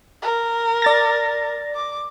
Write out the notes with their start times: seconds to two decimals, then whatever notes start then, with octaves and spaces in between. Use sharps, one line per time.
0.22 A#4
0.82 D5 A6 A#6
1.75 D6